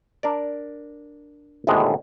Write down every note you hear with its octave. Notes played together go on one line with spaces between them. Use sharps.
D4 A#4 D5
A#1 D#2 A2 D3 G#3 B3